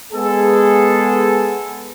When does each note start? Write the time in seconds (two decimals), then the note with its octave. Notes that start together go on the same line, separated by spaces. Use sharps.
0.13 G#3 B3 G#4 A4